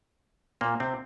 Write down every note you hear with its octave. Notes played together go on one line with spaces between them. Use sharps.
A#2 A#3
C3 C4